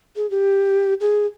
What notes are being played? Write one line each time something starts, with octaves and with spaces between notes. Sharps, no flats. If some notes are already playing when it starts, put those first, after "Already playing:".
G#4
G4
G#4